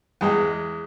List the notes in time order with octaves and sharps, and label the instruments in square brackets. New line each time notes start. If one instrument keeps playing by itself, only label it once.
[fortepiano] E2 G#3